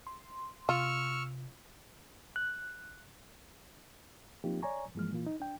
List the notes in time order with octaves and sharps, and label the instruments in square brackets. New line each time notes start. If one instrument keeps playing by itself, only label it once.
[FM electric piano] C6
[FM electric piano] C3 [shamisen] F4 [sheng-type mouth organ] C#6 E6 F6
[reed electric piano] F#6
F3 A#3 C4 D#4 F4 G4
C#5 D5 G#5 A#5 C#6
G2 E3 F3 G#3 A#3 F6
A#2 E3 A#3 F4
D#4
D4 G5